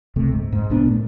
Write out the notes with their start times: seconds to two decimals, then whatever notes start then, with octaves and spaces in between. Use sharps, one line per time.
0.16 C#2 C3 A3
0.32 G#2
0.52 G#2
0.70 C2 B3 D4
0.86 A#2 A3